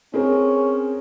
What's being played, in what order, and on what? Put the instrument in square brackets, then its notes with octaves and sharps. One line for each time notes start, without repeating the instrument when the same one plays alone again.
[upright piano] C4 G#4 A#4 [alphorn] C#4